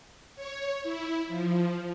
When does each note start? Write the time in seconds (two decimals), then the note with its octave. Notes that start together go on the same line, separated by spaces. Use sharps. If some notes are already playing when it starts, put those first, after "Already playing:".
0.36 C#5
0.83 E4
1.28 F3